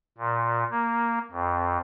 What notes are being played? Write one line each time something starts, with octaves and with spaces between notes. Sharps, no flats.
A#2
A#3
F2